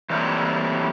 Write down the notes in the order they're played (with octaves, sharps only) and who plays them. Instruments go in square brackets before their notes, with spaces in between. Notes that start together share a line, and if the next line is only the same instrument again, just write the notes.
[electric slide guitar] E3 F#3 G3 A3 A#3 C4